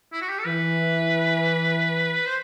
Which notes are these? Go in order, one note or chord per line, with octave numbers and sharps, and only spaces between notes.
E4
F#4
G4
A4
E3 B4
C5